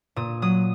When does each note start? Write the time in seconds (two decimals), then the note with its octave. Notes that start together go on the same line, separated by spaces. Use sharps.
0.16 A#2 D#6
0.42 F#3 D#6